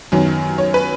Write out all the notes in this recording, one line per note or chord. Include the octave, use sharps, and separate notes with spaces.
F#2 D#3 F#3 B3
C#5
B4